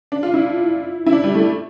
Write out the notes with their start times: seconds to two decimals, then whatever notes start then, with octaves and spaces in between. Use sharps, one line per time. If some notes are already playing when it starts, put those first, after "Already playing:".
0.12 D4
0.23 F4
0.34 E4
1.06 E4
1.13 D4
1.24 G3
1.34 A3